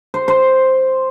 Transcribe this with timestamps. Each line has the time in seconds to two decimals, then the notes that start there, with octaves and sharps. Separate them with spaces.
0.14 C5
0.28 C5